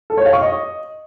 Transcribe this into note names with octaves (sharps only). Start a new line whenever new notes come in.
A4
C#5
F5
C#6
D#5